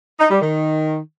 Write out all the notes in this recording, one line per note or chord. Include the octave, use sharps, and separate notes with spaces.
D#4
G3
D#3